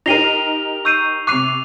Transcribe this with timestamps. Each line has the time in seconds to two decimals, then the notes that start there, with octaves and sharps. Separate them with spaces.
0.06 D#4 G4 A#4 A#6 C7 D#7 F7 G7
0.85 C#6 E6 G6 C7 D#7
1.27 C3 C#6 D6 F#6 C7 D#7 F7